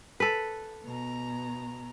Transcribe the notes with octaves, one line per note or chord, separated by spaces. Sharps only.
A4 B4
B2 A#5